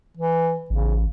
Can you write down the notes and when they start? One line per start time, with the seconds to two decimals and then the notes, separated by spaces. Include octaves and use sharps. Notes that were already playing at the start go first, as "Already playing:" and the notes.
0.17 E3
0.70 A1 C#3